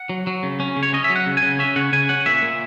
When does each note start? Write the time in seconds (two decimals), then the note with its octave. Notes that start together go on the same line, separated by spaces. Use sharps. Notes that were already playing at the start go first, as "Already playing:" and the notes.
Already playing: F#5
0.09 F#3
0.27 F#3
0.43 C#3
0.60 C#4
0.76 C#3
0.83 C#5
0.93 C#4 D#5
1.04 E5
1.10 F#3
1.16 F#5
1.27 C#3
1.37 G#5
1.42 C#3
1.59 C#4 E5
1.76 C#3 F#5
1.93 C#3 G#5
2.09 C#4 F#5
2.26 A#2 E5
2.42 A#2